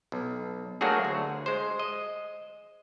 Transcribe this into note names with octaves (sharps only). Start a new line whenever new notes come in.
B1
F#3 A3 A#3 D4 F#4 G#4
D2
G#3 C5
D#5